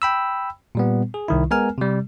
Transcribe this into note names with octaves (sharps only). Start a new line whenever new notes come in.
G5 B5 E6
A#2 G3 B3
G#4
C2 D#3 E4
G#3 B3 A#4 G#5 F6
C3 G3